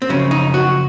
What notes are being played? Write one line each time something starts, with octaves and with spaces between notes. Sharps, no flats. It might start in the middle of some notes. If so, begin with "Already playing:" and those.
C4
F#2 C#3 F3 C#4
D#4
F#4